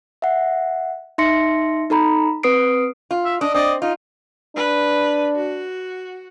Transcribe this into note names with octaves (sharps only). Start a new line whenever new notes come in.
E5 F#5
D#4 E5 C6 A#6 C#7
D#4 A4 A#5 B5
C4 B4 D#6 C7 D7
F4
E5
D4 D#5
C4 D5 D#5
D#4 F4
D4 B4
F#4